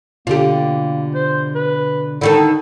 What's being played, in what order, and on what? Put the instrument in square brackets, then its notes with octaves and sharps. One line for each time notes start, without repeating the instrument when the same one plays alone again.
[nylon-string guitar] B2 D3 [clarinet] A#3 [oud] F4 G4
[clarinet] C5
B4
[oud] D3 D#3 A4 [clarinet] E4